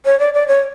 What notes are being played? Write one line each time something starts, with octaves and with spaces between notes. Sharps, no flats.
C#5
D5
D5
C#5